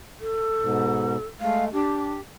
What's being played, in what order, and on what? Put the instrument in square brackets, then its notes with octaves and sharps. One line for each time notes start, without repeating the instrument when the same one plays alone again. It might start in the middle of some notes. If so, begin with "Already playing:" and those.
[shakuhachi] A4
[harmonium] G#2 B2
[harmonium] G#3 A3 [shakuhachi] F5
[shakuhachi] D4 [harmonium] G4